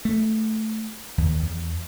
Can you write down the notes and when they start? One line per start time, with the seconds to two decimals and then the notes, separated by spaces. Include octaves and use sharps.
0.05 A3
1.18 D#2
1.42 E2